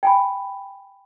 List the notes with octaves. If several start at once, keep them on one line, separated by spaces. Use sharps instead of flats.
G5 G#5 B5